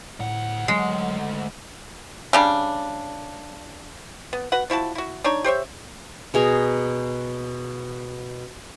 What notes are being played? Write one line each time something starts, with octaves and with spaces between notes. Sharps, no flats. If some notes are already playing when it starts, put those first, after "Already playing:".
D2 A2 F#5
F#3 G#3
C#3 G3 D4
B3
F#4 B4 F#5
F3 E4 F#4 A5
E4 F#4
D4 D#4 C#5
G4 C5 C#5 E5
B2 G#4 A#5 C#6